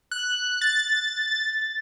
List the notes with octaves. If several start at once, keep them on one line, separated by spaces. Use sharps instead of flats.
F#6
A6